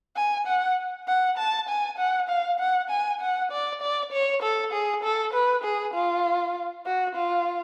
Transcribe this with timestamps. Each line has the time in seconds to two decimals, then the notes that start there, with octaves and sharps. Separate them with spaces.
0.16 G#5
0.47 F#5
1.08 F#5
1.38 A5
1.69 G#5
1.99 F#5
2.29 F5
2.60 F#5
2.90 G#5
3.21 F#5
3.52 D5
3.82 D5
4.13 C#5
4.43 A4
4.73 G#4
5.04 A4
5.33 B4
5.64 G#4
5.94 F4
6.86 F#4
7.16 F4